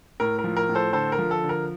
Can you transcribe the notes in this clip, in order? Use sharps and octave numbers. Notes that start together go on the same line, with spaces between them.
A2 A#4
A#4
F3
A#4
A2
A4 C5
D3 A4 C5
A#4
F3
A4
D3
A#4